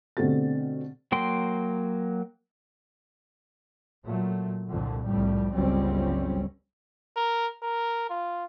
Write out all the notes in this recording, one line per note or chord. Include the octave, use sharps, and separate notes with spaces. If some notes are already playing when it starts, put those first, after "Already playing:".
B2 D3 A3 C4 G4 A6
F#3 A#3 G5 C6
A#2 F#3 A3
C2 F2 A#2 D3
C2 F2 A2 G3
G1 C#2 F#3 G3 C4 C#4
A#4
A#4
F4